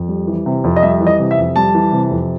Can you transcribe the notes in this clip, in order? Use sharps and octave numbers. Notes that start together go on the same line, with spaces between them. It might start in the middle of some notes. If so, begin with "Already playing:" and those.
Already playing: F2
G3
E3
C3
F2
D#5
G3 E5
E3
D#5
C3
E5
F2
G3 A5
E3
C3
F2